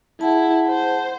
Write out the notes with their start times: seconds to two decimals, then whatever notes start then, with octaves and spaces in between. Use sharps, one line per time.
0.21 E4 G#4 F#5 A5
0.69 C5